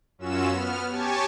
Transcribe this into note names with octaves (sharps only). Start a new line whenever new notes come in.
F#2 C#4 F4 F#4 E6 E7
B3 F6
G4 C#5 G#5 A5 C#6